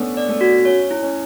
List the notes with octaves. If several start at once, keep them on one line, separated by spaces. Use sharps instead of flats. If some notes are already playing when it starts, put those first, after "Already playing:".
Already playing: A3 B3 C#4 D4
D5
A3
F#4
C#4 C#5
E4
C#4